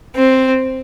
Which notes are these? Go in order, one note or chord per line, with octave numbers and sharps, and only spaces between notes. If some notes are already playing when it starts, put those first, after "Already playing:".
C4